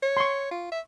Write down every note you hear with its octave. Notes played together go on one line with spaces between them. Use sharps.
C#5
C6 C#6
F4
E5